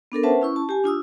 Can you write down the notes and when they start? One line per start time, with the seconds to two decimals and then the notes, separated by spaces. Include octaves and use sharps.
0.12 B3 D4 A4 A#4
0.23 C#4 B4 C5 E5 F#5 A5
0.41 C#4 E4 C#6
0.56 A5
0.69 G4 G#5
0.84 D4 F4 D#6 E6